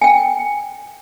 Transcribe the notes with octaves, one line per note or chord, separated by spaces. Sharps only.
G5 G#5